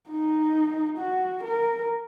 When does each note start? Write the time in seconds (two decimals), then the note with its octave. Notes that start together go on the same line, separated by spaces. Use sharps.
0.09 D#4
0.98 F#4
1.43 A#4